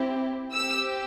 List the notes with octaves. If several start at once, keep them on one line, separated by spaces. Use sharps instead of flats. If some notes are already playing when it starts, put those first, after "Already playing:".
Already playing: C4 E4 G4
C4 G4 E6